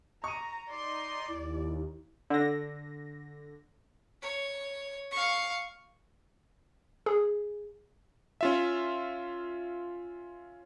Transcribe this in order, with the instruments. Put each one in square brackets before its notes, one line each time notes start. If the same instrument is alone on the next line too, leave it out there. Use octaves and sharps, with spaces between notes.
[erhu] A#5 [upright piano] C#6 D#7
[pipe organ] D#4 C6 [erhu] D5
[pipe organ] D#2 [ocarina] E4
[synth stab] D3 A#6
[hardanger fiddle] C#5
F5 C#6
[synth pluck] G#4
[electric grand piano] C#4 F4 E5